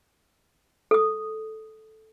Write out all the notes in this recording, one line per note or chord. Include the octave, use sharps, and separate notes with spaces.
A4 D#6